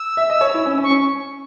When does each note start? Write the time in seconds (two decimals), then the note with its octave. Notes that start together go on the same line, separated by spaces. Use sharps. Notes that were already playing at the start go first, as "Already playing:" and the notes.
Already playing: E6
0.17 E5
0.30 D#5
0.41 C#5
0.54 E4
0.65 C#4
0.78 C#4
0.83 C#6
0.90 C#4